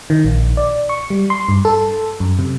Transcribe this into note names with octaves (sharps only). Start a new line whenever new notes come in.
D#3
A#1
D5
C#6
G3
C6
G2
A4
F#2
C3